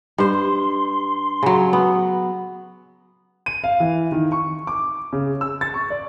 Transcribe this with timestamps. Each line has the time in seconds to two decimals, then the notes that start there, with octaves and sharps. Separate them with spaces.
0.18 G2 C5 C6
1.43 C#3 F#3
1.73 B3
3.46 D#7
3.64 F5
3.80 E3
4.12 D#3
4.32 C#6
4.67 D6
5.13 C#3
5.41 E6
5.61 A6
5.74 C#6
5.90 D5